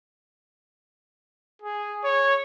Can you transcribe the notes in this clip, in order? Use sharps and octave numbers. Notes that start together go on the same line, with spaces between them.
G#4
C#5